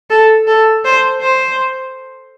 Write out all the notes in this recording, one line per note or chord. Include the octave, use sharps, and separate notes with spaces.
A4
A4
C5
C5